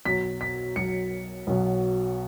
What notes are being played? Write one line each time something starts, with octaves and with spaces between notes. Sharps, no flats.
B1 B2 F#3 B6
B6
B1 B2 F#3 C#7
B1 B2 F#3